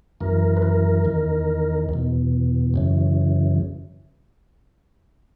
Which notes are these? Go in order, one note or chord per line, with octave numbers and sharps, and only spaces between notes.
F#2 E3 A#4
B4
A#4
E2 D#3
E2 B2
F#2 C#3 E3